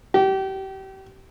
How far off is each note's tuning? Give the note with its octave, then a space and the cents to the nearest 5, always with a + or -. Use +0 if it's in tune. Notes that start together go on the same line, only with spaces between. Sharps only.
G4 -30